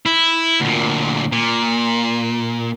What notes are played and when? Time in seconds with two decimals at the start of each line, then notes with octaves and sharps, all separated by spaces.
0.06 E4
0.61 D2 A#2
1.32 A#2